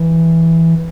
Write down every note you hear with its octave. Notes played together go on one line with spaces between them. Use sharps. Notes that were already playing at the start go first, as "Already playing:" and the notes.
Already playing: E3